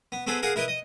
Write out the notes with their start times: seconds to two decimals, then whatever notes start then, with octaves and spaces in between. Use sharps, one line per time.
0.12 B3
0.27 B3 C4 G#4 A4 B4
0.43 G#4 A#4 F5 F#5
0.56 E4 A#4 B4 D#5
0.68 D#5